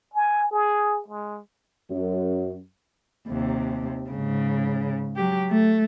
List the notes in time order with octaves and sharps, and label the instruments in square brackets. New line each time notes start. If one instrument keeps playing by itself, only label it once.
[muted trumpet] G#5
G#4
G#3
[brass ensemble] F#2
[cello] D#2 C3
G#2 C#3
F#3 G4
A3